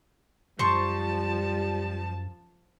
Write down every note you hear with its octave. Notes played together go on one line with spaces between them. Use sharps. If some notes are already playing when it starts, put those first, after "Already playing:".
F#2 F3 G3 C5 A5 C#6